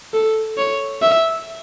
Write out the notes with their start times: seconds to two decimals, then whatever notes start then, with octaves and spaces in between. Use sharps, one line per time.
0.14 A4
0.57 C#5
1.02 E5